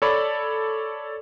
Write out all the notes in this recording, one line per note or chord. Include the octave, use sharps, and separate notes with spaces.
A4 C#5 D5 B5